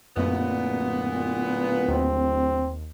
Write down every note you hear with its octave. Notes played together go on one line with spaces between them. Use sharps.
D1 F#2 A#2 B3
D#2 C4